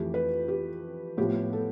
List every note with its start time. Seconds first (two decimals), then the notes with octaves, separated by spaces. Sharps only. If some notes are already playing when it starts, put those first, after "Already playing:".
Already playing: F2 E3 A3 G4
0.14 B4
0.48 G4
1.17 A2 F3 B3 G4
1.53 A4